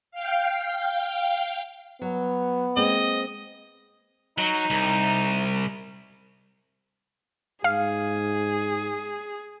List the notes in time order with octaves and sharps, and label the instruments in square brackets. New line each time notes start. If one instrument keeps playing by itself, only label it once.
[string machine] F5 G5
[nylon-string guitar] F#3 [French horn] B3
[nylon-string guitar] G#3 A#3 C4 [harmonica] D#5
[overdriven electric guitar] F#3 [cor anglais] D#4
[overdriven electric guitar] C2
[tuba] G#2 [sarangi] G#4 [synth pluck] F5